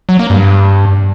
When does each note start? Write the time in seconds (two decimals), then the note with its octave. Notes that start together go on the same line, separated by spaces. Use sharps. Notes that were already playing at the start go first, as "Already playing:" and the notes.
0.09 F#3
0.19 A#3
0.30 G2